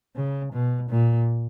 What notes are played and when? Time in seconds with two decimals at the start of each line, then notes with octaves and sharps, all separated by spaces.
0.16 C#3
0.53 B2
0.90 A#2